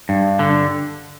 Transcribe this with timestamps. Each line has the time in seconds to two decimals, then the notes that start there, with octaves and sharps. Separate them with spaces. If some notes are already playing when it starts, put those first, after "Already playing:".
0.09 G2
0.39 D3